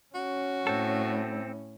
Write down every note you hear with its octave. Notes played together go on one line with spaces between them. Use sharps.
C#4 F#4
A2 C4 A4